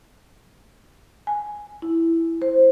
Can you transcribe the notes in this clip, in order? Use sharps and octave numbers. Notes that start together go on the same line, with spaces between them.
G#5
E4
C5